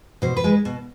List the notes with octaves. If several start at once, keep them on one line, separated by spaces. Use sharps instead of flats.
B2 C5
B4
G#3
B2